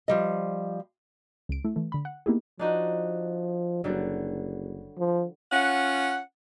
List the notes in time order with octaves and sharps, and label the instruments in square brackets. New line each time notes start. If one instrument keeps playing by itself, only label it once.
[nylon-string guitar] F3 G3 D#5
[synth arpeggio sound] C#2 D7
A3 E4
E3 A3
D3 B5
F#5
A#3 B3 D#4 E4 G4 G#4
[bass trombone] F3 [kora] D4 D#4 F#4
[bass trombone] F#1 [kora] D3 F#3 G3
[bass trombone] F3
[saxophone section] C#4 F4 F#5